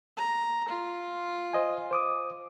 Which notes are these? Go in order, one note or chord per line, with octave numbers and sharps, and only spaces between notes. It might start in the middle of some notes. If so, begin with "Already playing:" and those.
A#5
F4
C5 D#5 G#5
C5 D6 D#6